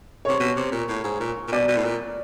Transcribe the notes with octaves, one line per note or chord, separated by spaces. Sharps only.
C3 C#5
B2
C3
A#2
A2
G#2
A#2
A#2
B2 D5
B2
A2
A#2